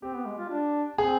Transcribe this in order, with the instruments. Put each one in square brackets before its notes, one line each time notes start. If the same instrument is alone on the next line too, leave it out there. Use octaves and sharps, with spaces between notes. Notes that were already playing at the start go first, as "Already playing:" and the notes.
[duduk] C4 [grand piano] G4
[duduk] B3
G#3
F4
D4
[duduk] C4 [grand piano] G#4